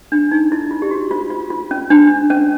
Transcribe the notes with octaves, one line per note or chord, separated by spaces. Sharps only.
D4
D#4
E4
F4
G4
F#4
F4
F4
F4
C#4
D4
C#4